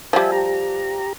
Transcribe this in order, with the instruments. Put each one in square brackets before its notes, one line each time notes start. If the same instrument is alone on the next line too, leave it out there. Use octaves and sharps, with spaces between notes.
[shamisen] F3 G3 [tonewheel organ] E5 G#5
[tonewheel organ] G4 A#5